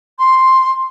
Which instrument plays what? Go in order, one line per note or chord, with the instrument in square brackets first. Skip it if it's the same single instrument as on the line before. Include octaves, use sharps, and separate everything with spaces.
[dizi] C6